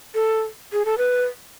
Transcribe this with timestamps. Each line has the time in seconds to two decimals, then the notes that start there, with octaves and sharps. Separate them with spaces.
0.15 A4
0.73 G#4
0.85 A4
0.98 B4